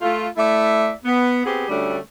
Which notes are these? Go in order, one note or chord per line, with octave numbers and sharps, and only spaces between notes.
A3 F4
A3 E4 D5 E5
B3
B3 C4 G4 G#4
D2 G3 A3 C#4 D4